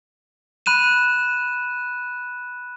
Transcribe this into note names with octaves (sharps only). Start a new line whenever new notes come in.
B5 F#6 D#7 E7